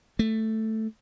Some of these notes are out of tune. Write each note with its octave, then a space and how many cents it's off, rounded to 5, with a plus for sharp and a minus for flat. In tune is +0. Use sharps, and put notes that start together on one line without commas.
A3 +5